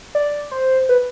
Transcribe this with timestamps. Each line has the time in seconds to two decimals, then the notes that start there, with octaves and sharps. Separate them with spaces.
0.15 D5
0.51 C5
0.89 B4